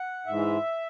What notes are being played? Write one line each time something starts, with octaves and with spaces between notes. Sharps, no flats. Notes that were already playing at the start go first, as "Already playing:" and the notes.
Already playing: F#5
G#2 E3 G#3 E5